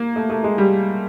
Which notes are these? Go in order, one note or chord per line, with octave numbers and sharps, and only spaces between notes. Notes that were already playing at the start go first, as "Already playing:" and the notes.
Already playing: A#3
A3
A3
G#3
G3